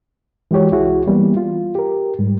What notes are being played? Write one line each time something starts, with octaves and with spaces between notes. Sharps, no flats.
E3 G#3 F#4 G4 C#5
C2 E4 F#4 G#4
E3 G3 A#3 B3
F4
G4 A#4
G#2 G3